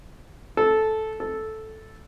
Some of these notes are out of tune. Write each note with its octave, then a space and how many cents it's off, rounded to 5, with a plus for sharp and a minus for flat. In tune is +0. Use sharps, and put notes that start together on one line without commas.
A4 -10
A4 -5